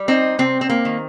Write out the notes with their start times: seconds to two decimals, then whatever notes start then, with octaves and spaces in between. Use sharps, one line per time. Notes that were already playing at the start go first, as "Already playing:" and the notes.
Already playing: G3
0.08 C4 D#4
0.39 C3 C4
0.61 C4
0.69 A#3
0.85 D#3